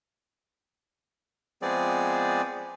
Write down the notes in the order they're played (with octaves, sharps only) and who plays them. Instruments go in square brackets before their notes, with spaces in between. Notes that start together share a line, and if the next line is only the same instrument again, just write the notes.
[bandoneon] F3 G#3 B3 C4 G#4 D5